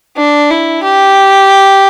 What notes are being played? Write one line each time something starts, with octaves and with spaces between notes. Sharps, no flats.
D4
E4
G4